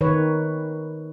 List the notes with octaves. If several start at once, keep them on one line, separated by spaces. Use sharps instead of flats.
D#3 B4 C#5